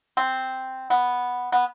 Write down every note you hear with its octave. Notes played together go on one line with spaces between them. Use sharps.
C4
B3
B3